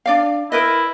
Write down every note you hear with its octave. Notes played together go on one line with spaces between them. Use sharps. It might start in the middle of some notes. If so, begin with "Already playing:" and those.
D4 D5 F5
E4 A#4 B4 D#5